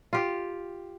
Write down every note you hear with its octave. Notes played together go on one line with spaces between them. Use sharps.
F4 G4